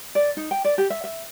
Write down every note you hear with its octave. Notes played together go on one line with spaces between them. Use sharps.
D5
D#4
G5
D5
G4
E5
E5